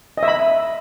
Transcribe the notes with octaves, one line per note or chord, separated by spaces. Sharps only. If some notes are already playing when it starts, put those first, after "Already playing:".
D#5
E5
B5